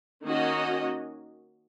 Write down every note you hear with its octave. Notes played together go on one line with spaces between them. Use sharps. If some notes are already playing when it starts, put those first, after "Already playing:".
D#3 A#3 C#4 F#4 D#5